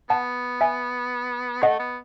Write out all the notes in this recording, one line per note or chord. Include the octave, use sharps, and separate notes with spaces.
B3 F#5 A5
E5 G#5
A3 D#5 F#5
B3